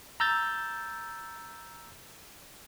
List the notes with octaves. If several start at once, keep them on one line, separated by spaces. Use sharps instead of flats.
A#5 E6 G6 A6